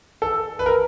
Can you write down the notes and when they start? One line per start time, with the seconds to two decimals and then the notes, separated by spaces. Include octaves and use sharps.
0.22 A4
0.59 B4
0.66 A#4